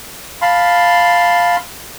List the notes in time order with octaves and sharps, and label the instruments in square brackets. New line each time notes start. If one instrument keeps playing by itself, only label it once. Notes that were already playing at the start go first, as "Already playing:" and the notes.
[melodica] F5 A5 B5 C6